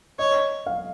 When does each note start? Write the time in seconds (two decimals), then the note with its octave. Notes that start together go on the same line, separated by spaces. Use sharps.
0.19 C#5 D#5
0.66 F5